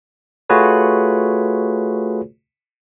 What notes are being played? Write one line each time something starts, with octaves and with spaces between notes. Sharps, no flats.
A3 F4 F#4 G#4 B4 C#5